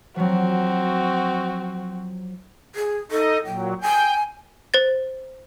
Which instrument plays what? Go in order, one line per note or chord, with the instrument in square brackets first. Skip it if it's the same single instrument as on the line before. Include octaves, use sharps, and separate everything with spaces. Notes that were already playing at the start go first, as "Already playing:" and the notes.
[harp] F3 F#3 [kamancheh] C4 F#4
[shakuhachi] G#4
[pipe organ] D#4 D#5 [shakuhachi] A4
[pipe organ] A#2 F#3 [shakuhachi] G5
[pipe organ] G5 [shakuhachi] G#5
[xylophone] C5 A6